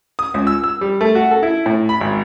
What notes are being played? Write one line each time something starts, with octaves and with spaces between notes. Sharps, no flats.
D#6
C#2
E6
E6
G3
A3
F#4
A4
E4
A2
B5
G#1